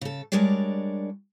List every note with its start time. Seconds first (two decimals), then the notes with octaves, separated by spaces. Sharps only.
0.01 C#3 A4
0.32 G3 G#3 D4 A#4 C#5 D5